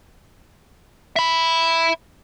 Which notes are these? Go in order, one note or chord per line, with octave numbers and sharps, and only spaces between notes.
E5 B5